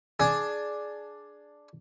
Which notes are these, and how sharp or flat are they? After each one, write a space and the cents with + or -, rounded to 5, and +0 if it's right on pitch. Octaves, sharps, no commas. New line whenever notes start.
D4 +0 G#4 +15